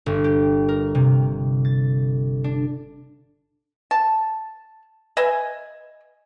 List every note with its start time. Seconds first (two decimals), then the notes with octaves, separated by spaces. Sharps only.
0.06 G1
0.24 G4
0.68 A#4
0.95 C3
1.65 A6
2.44 D4
3.91 A5
5.17 B4 D#5 E5 G#5